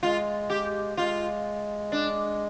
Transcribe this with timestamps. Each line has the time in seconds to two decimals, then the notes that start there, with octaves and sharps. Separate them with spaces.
0.03 G#3 F4
0.50 G4
0.97 G#3 F4
1.92 D4